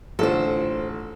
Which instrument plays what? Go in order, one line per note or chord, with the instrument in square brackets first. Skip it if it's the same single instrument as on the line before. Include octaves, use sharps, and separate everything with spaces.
[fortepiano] A1 D3 F4 [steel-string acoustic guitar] A4 C5